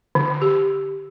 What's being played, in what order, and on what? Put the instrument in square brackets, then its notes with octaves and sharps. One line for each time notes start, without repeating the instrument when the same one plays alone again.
[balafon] D3
G4